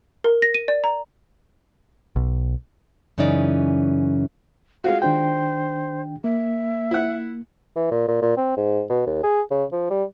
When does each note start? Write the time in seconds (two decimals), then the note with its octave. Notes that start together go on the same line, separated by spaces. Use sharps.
0.24 A#4
0.42 A#6
0.54 D#7
0.68 D5
0.84 A#5
2.16 B1
3.18 F#2 C#3 E3 C#4 D#4 D5
4.84 G#3 F4 F#4 F5
5.02 D#3 D4 C5 G5
6.24 A#3 E5
6.91 E4 F#5
7.76 E3
7.91 A#2
8.08 A#2
8.22 A#2
8.37 C4
8.57 G#2
8.89 B2
9.06 D#2
9.24 G#4
9.51 C#3
9.72 F3
9.90 G3